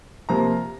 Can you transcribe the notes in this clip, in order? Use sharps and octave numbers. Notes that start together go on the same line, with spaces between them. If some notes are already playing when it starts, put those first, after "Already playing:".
C3 F3 A#3 A#5